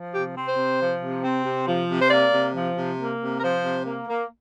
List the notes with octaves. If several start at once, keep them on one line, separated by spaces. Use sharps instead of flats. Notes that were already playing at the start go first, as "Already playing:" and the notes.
Already playing: F3
C3 G4
C4
C5
C3
F3
C3
C4
C3
F3
C3
C5
A#3 D5
C3
F3
C3
A#3
C3
A#4
F3 C5
C3
A#3
A#3